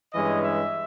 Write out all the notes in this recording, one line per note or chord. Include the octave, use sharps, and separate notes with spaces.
G2 E3 G#3 C#4 D#5
E5